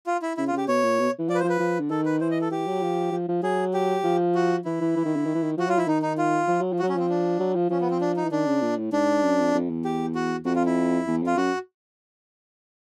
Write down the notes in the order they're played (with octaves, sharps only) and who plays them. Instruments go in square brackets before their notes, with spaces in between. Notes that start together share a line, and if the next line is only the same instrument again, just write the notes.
[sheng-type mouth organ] F4
E4
[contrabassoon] C#3 [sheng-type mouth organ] E4
[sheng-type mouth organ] F4
[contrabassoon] C#3
[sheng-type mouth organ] G4
[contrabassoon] B2 [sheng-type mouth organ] C#5
[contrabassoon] A#2
B2
E3
[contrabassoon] F3 [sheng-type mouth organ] D5
[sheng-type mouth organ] B4
C5
[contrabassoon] F3
[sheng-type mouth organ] B4
[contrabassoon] F3
D3
[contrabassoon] D#3 [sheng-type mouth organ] A4
[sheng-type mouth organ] B4
[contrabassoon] E3 [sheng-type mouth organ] C5
[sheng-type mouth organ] D#5
A4
[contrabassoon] E3 [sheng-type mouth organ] G4
[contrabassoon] F#3
F3
F3
F3
[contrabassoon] F#3 [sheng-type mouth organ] G#4
[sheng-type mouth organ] G4
[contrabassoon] F3
[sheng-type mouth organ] F#4
[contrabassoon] E3 [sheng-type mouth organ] E4
[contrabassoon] E3
E3
D#3
D3
D#3
E3
D#3
[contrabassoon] F3 [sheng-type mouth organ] F#4
[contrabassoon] F#3 [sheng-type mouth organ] F4
[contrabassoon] F3 [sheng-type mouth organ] E4
[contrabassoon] D#3 [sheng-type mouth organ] D#4
[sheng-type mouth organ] D#4
F4
[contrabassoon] F3
F#3
F3
[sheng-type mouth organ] F#4
[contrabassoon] F#3
[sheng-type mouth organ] C#4
[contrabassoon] F3 [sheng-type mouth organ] C4
[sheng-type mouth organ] D4
[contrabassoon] F#3
F3
[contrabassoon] F3 [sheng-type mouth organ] C#4
[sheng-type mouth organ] B3
C4
D4
D#4
[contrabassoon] E3
[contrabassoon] D#3 [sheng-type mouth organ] D4
[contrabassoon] C#3
A#2
A2
[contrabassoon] G#2 [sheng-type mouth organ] D4
[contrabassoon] F#2
F2
F2
E2
[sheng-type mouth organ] G4
F#4
[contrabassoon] F2 [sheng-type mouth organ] F#4
[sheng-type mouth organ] F4
E4
[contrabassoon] E2
[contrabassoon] F2 [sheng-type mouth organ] F4
[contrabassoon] F#2 [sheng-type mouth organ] F#4